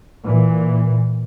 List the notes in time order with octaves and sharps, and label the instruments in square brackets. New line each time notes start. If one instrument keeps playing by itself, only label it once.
[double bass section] A#2 E3